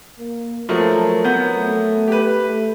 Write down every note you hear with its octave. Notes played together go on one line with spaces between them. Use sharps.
A#3
F3 F#3 A3 A#4
F#3 B3 G6
A3
G4 B4
A3